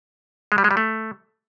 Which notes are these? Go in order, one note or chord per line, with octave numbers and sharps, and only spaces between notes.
G#3
G3
G#3
G3
A3